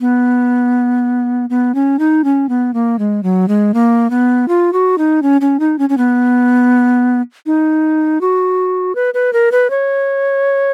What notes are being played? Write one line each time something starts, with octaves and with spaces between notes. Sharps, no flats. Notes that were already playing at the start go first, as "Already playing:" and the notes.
B3
B3
C#4
D#4
C#4
B3
A#3
G#3
F#3
G#3
A#3
B3
F4
F#4
D#4
C#4
C#4
D#4
C#4
C#4
B3
D#4
F#4
B4
B4
A#4
B4
C#5